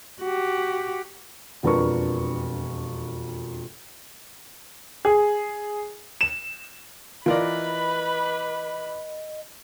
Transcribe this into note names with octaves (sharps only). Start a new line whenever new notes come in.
F#4 G4
E1 F2 D4 A#4 B4 C#6
G#4
E7
E3 F4 A#4 B4 D5 D#5 B5